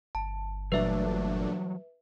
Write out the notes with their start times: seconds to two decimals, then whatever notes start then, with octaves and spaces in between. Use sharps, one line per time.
0.15 G1 A5
0.72 A#2 E3 F#3 G3 A3 D4 B4 E5